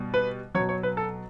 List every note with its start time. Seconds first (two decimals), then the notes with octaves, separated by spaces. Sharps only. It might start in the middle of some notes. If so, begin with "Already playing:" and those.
Already playing: B2 G3
0.14 B4
0.55 F#3 C#5
0.60 B2
0.69 C#5
0.83 B4
0.97 A4